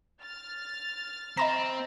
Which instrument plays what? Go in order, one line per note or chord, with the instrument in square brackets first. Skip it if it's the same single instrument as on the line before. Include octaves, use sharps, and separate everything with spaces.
[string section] F6 A6
[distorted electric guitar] C4 [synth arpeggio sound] D#5 B5 A#6 [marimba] A#5